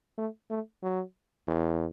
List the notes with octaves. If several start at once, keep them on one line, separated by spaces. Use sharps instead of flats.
A3
A3
F#3
E2